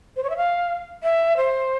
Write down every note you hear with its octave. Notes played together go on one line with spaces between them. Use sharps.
C5
C#5
E5
F5
E5
C5